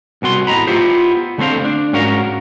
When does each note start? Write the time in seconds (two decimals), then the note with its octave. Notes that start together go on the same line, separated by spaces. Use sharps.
0.22 C2 B2 F#4 C6
0.47 A2 D#5 A#5 B5
0.67 B3 E4 F4 G4 C5
1.38 D3 A3 C4 C5 F5
1.64 D4
1.93 G#2 C#4 F#4 A#4 F5